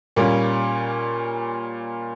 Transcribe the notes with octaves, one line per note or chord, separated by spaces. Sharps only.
A#2 G3 A#3 C#4 F4